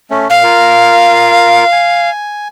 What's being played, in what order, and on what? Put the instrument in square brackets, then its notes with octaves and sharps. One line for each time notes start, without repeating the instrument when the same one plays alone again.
[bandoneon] A3 C#4
[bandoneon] A#2 [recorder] F5
[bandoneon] F4 A#4
G#5